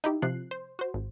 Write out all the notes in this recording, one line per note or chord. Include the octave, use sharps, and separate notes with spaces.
D#4 E4 G4
C3 F3 F#6 C7
C5
F#4 C5
G#1